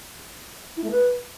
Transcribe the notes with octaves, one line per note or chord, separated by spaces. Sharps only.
E4
A3
B4